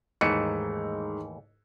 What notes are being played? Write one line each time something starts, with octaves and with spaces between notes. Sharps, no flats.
D#2 G#2 E3 A3 D#4 C#7